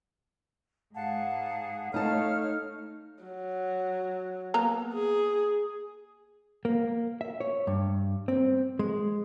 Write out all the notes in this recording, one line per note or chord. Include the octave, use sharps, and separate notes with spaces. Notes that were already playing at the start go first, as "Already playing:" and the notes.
G#2 G#4 F5 F#5 A5
A3 D#4 C#5 F5 A5 F6
F#3
A#3 B3 A#5
G#4
A#3
E5
C#5
G2
C4
G#3